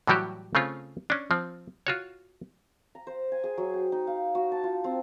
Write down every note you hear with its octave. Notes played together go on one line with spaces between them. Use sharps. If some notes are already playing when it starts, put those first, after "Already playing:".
A2 E3 F#3 G3 F#4 G4
C#3 A3 C4 C#4 F4
C#4 D4
F3 C4
F4 F#4 C#5
A#5
C5
G#5
G#4
F#3
G5
D#4
F5
F#4
A5
F4
C4